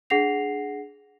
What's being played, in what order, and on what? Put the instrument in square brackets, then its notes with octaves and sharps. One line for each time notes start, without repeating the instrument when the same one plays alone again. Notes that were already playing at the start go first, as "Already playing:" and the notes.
[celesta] D4 G#4 F#5 A#6 C7 F7